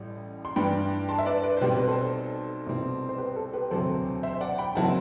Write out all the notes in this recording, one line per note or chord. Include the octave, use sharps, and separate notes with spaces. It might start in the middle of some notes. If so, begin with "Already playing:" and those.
Already playing: A1 A2 G3
C6
G2 E3 G3 D4 G5 B5
A5 C6
E5
B4 D5
B4 D5
C5
B1 B2 G3 C4 G4 B4
B4
A4 C5
C2 B2 G3 C4 E4
C5
G4 B4
A4
G4 B4
E1 D2 C3 F#3 C4 A4 C5
C5 E5
D5 F#5
G5 B5
F#1 F#3 C4 E4 F#5 A5